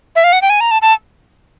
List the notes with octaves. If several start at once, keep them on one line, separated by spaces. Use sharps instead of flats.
E5
F5
F#5
G5
G#5
A#5
A5
A5